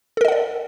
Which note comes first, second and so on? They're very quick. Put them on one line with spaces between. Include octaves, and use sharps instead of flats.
A4 A#4 D#5 F#5 D5